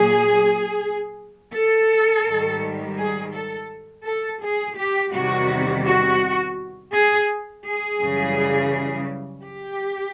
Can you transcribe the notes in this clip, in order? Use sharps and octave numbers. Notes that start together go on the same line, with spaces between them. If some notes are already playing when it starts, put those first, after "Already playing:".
Already playing: A#2 F#3 G#4
A4
G#2 D#3 G3
G#4
A4
A4
G#4
G4
E2 C3 D#3 G3 F#4
F#4
G#4
G#4
F#2 C#3 E3 G3
G4